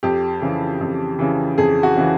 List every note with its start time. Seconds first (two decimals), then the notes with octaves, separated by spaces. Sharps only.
0.03 F2 G4
0.42 C#3 E3
0.81 F2
1.19 C#3 E3
1.58 F2 G#4
1.83 F#4
1.96 C#3 E3